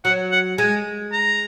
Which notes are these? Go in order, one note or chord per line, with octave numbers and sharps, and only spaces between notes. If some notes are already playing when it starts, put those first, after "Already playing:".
F#3 F#5
F#5
G#3 G#5
A#5